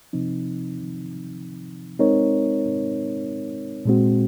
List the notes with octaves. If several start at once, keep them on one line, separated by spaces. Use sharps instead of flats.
C3 F3 C4 D#4
G#3 C4 D#4 A#4 C#5
A#2 G#3 C4 F#4